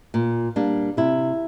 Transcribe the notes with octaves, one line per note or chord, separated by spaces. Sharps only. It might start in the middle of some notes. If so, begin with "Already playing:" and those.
A#2
G3 A#3 D4
C3 E4